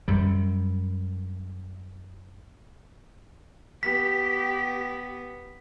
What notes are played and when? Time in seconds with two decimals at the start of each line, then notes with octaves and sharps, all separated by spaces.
0.08 F#2 G3
3.83 B3 G4 B6